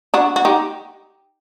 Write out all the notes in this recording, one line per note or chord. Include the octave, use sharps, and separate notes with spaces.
D4 F#4
F#4
D#4 G4